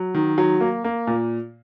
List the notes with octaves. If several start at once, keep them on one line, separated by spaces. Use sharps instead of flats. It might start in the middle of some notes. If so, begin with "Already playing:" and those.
Already playing: F#3
D#3
F#3
A#3
A#3
A#2